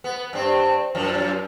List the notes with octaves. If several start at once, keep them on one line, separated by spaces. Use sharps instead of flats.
B3
G2 C4
F#2 F3